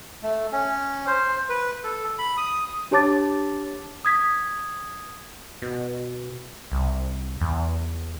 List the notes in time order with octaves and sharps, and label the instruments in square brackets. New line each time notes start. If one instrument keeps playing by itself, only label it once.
[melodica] A3
C#4
C5
B4
A4
B5
D#6
[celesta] D4 G4 C#5 A5 D6 A6
D#6 G#6 B6
[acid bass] B2
C2
E2